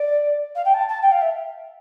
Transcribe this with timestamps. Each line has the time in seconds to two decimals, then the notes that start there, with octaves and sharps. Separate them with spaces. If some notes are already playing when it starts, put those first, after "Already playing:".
Already playing: D5
0.55 F5
0.65 G5
0.74 A5
0.88 A5
1.02 G5
1.12 F5
1.22 E5